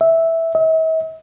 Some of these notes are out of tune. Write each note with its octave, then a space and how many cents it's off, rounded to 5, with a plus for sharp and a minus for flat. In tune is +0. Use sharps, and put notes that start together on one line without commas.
E5 -5
E5 -45